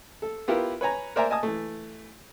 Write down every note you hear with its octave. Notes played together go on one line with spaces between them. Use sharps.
A4
B3 E4 F4 G4 A#4
B4 C#5 G#5 A#5
A#4 C5 D5 E5 G#5 A#5
D#5 G#5 A5 D#6
E3 A3